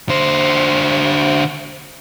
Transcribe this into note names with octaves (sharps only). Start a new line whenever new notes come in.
D3 C5